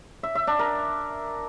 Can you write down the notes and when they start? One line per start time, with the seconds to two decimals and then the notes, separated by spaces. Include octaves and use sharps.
0.23 E5
0.35 E5
0.47 D4
0.59 A#4